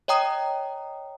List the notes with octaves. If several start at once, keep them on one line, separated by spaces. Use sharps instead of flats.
C#5 D#5 G5 A#5 D#6